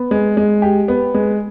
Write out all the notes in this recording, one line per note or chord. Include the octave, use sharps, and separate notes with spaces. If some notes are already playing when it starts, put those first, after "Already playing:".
Already playing: B3
G#3
G#3
G4
B3
G#3